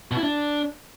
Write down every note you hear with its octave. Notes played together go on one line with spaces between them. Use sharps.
B2
E4
D4